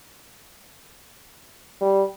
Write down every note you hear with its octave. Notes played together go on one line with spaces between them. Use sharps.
G3